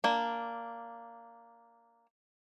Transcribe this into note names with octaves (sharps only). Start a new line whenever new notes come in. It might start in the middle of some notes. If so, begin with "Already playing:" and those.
A#3 D4